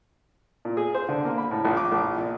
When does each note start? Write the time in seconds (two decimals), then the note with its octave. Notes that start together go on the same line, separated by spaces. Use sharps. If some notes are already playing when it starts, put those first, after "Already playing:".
0.65 A#2
0.77 G#4
0.94 C5
1.09 D3
1.25 A#3
1.38 B5
1.51 A2
1.65 A#1
1.77 D6
1.92 A#1
2.18 A#2